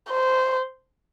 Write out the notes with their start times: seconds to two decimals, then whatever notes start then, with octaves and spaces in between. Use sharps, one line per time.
0.11 C5